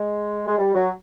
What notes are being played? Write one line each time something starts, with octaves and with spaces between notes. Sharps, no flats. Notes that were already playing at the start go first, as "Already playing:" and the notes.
Already playing: G#3
G#3
G3
F#3